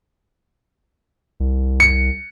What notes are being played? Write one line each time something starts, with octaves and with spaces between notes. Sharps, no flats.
C2
C#7